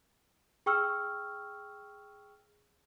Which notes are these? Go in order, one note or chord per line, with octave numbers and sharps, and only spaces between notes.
G#4 G5 C#6 E6 F6